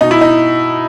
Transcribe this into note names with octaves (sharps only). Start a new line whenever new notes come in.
B2 D#4
E4
D#4